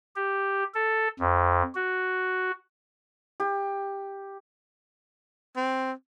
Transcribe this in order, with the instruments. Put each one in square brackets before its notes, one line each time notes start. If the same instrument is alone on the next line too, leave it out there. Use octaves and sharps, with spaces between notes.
[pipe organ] G4
A4
F2
F#4
[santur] G4
[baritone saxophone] C4